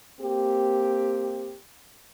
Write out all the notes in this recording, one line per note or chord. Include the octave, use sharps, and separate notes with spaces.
A#3 C4 G4